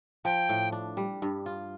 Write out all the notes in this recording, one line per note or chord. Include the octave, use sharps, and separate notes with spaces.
F3 G5
A2
D4
G3
G2
F4